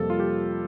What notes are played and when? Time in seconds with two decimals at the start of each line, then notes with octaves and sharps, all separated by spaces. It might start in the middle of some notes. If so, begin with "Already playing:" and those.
Already playing: F2 C3 G3 A#3 A4
0.10 F4
0.20 G4